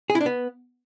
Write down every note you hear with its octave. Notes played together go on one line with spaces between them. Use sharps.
G#4
E4
D4
B3